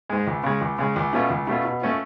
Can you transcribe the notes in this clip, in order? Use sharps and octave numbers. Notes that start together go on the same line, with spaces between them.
G#2 G#3
C#2
C#3 G#3
C#2
C#3 G#3
C#2
B2 A3 C#4 F4
C#2
B2 A3 C#4 F4
B2
A3 C#4 F4